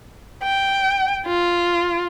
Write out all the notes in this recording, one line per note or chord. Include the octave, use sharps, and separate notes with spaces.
G5
F4